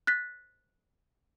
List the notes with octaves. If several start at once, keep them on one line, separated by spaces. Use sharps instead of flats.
F#6 A6 B6